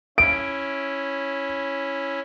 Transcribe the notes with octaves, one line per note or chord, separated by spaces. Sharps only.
C#4 E4 D7